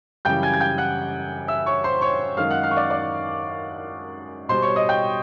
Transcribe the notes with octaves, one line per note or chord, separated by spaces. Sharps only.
F#2 C#3 E3 G3 G5 G6
G#5 G#6
G#6
G5 G6
F#5 F#6
E5 E6
C#5 C#6
C5 C6
C#5 C#6
F#2 D#3 G#3 F5 F6
F#5 F#6
F5 F6
C#6
D5 D6
D5 D6
B2 G3 C5 C6
C#5 C#6
D#5 D#6
G5 G6